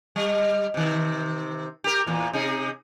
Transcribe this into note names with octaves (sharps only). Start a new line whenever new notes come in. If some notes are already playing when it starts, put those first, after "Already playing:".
G3
C3 D#3
G4 A#4
E2 A#2 E3
C3 D#4 G#4